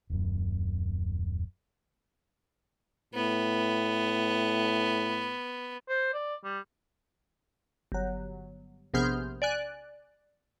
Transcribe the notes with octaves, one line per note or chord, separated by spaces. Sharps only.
D#1 F#2
A2 B3
C5
D5
G3
G1 F#3
A#1 C3 B3 G#4 F6 G6
D5 G#5 F#6